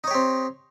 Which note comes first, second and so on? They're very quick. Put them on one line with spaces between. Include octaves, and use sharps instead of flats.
D#4 C#5 G4 C4